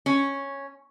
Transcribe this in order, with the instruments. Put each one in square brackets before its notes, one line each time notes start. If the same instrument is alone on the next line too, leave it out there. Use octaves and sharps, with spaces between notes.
[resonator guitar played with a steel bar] C#4